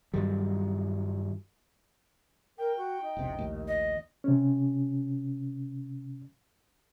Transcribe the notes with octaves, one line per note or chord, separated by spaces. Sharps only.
G2 D#3 F#3 G3
A#4 G5
F#4
D#4
E1 A#1 C3
A#1 D#2 A2
D#5
C3 C#4